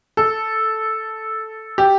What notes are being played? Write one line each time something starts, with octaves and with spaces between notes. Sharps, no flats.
A4
G4